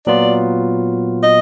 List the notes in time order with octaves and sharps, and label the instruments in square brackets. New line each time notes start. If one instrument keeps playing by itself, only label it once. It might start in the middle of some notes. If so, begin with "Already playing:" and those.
[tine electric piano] A#2 F#3 B3 F4 [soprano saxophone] D5
[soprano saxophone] D#5